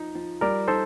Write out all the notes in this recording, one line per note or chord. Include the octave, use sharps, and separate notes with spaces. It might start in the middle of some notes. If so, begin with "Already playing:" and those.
Already playing: F3 D#4
F3
G3 A#4 D5
D#4 A4 C5